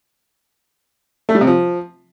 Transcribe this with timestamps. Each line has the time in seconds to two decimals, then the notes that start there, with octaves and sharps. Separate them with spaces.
1.29 A3
1.35 G3
1.41 C3
1.47 F3